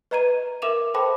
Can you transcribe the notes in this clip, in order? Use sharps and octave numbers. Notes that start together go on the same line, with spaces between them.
B4 D#5 A#5 G#6 D#7
A#4 E5 D6 E7 F7
A4 C5 G5 A5 B5 D6